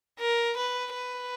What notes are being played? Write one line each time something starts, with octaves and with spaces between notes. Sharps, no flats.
A#4
B4
B4